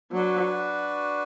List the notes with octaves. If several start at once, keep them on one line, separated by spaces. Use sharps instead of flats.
F#3 D4 F#4 B4